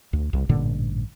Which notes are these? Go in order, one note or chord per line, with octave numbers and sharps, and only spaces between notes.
D2
C2
A1 G2 A#2 D3